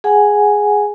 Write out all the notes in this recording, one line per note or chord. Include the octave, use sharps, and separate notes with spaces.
G#4 F#5 G#5